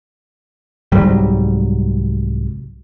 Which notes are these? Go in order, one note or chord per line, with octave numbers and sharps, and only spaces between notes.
C2 G#2 F#3 G3